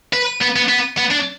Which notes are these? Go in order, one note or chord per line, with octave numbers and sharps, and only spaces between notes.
B4
B3
B3
B3
B3
D4